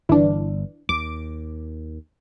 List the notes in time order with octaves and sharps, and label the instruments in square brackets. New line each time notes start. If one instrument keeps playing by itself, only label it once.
[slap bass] G1 [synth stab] E3 D4
[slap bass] D#2 [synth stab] D6